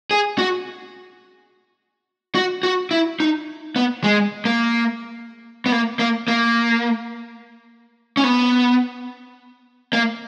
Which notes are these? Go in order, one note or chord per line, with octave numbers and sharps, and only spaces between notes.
G#4
F#4
F#4
F#4
E4
D#4
B3
G#3
A#3
B3
A#3
A#3
A#3
C#4
B3
A#3